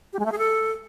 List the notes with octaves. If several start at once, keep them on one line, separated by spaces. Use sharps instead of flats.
G4
G#3
A3
G#4
A4